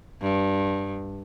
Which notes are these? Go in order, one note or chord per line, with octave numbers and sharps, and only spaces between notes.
G2